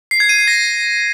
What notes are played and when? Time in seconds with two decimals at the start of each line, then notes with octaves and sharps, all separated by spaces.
0.11 C7
0.20 G#6
0.29 D#7
0.38 C7
0.48 A#6